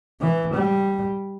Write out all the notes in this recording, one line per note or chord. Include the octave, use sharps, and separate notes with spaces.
E3
G3